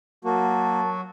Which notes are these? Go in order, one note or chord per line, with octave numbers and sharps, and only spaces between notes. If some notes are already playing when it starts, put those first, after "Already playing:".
F#3 A#3 F#4 A5